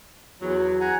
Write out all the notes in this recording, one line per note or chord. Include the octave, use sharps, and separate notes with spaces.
E2 F#3
F#5 G#5 A#5